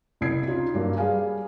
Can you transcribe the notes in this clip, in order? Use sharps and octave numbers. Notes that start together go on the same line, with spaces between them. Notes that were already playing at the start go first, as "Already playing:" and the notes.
F#1 C2 C3 E4 G#6 C7
C#4 D#4 F4
G2 F#3 A#3
G3 G#4 B4 F5 G#5